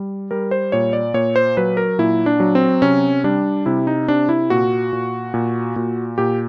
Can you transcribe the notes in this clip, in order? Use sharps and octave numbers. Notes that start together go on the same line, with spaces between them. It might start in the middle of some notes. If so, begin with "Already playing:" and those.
Already playing: G3
G3 A#4
C5
A#2 C#5
D5
A#2 C#5
C5
F#3 B4
A#4
A#2 E4
D4
F#3
C4
C3 C#4
G3 D4
C3 E4
D#4
C3 D4
E4
A#2 F#4
A#2
A#2
A#2
A#2 G4